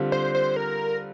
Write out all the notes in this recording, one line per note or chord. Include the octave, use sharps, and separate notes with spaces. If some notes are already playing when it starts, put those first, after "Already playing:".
Already playing: D3 G3 C4 F4
C5
C5
A#4